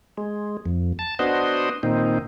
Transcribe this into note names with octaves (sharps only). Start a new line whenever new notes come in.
G#3
F2
A5
B3 D4 F#4 C5 D#5
A#2 D#3 C4 D#4